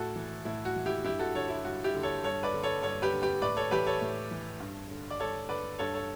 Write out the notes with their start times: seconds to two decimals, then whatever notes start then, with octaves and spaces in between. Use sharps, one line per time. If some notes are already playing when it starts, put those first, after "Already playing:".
Already playing: A2 F#4 A4
0.16 E3
0.45 A2 E4
0.65 F#4
0.76 E3
0.86 E4 G4
1.05 G2 E4 G4
1.19 F#4 A4
1.35 D3 A4 C#5
1.49 E4
1.64 G2 F#4
1.84 E4 G4
1.95 D3
2.03 A4 C#5
2.23 G2 A4 C#5
2.43 B4 D5
2.54 D3
2.63 A4 C#5
2.82 G2 A4 C#5
3.02 G4 B4
3.13 D3
3.22 G4 B4
3.42 A2 B4 D5
3.57 A4 C#5
3.71 E3 G4 B4
3.86 A4 C#5
4.01 A2
4.31 E3
4.60 G2
4.91 D3
5.10 D5
5.20 G2 A4 C#5
5.49 D3 B4 D5
5.79 G2 A4 C#5
5.94 A4 C#5